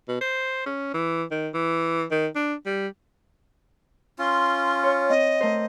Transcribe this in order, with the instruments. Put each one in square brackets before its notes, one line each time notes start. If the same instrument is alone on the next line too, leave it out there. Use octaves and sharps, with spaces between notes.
[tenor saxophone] B2
C5
C#4
E3
D#3
E3
D#3
D4
G3
[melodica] C#4 F4 [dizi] C6
[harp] C#5
[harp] C4 [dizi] D#5
[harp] A3 A#4 C5